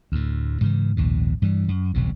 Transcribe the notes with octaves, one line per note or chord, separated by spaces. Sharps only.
D2 A2
G#2 C#3 E3
A#1 D#2 G#2 B2
G2 E3 G3
F#2
D#1 B1 C3